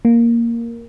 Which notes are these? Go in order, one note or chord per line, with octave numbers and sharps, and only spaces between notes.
A#3